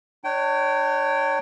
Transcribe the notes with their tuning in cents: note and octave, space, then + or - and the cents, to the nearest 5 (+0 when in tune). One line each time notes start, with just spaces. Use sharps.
D4 +40 C#5 +0 G5 -20